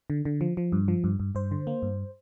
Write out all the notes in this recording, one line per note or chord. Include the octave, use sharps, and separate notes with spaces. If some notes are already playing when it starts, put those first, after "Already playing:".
D3
D3
F3
F3
G2
F3
G2
G2
G2 C5
D3
A#3
G2